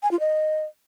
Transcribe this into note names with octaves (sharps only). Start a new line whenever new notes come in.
G#5
F4
D#5